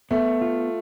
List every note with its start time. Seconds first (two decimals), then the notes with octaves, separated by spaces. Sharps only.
0.11 A3 B3
0.41 F4